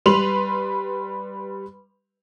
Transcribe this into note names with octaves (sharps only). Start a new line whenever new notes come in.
G3 B4 C6 F7 F#7